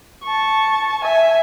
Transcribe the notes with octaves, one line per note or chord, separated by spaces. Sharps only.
A5 C#6
E5 G#5